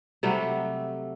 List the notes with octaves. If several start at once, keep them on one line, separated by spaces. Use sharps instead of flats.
C3 F#3 G3 A3